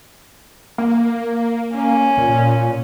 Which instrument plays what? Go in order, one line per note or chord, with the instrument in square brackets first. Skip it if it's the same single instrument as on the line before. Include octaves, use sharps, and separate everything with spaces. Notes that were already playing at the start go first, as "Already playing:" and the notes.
[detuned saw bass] A#3
[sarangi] C#4
[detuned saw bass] A#2